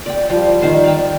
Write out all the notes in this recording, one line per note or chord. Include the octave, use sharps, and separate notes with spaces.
D5 G5
F3 G3
D#3 C5 C6
D5 F5 G5